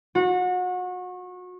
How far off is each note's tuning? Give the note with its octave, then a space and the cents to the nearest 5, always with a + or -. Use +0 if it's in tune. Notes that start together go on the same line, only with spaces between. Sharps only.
F#4 -30